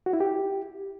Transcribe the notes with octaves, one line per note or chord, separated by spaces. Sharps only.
F#4
E4
G4